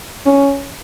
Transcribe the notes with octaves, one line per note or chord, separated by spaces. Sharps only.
C#4